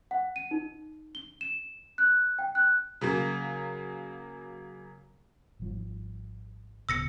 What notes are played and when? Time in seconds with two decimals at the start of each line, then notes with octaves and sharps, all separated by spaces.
0.11 F#5
0.36 D#7
0.51 D#4
1.15 G7
1.41 E7
1.98 F#6
2.39 G5
2.55 F#6
3.01 C#3 F#3 A#3
5.60 G#1 F3 G3
6.89 D1 C#3 B3 E6 A#6 C#7